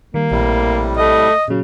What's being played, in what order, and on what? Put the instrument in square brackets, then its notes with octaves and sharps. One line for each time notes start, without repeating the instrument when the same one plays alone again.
[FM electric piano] D#3 G3 [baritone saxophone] A#3
[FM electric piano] A#1 [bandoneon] A2 C3 G3
[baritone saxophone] A3 [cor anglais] D#5
[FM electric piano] A#2 F#3 [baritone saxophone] C#3